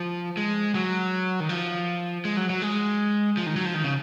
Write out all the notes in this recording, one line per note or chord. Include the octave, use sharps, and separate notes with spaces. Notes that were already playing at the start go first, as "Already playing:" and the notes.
Already playing: F3
G#3
F#3
D#3
F3
G#3
F#3
F#3
G#3
F3
D#3
F#3
F3
D#3
C#3